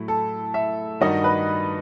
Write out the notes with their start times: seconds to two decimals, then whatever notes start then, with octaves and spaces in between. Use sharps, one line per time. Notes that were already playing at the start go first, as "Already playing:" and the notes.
Already playing: A2 F#3 A3 E4
0.08 A4
0.54 E5
1.01 G2 D#3 G3 D#4 F#4 D#5
1.24 B4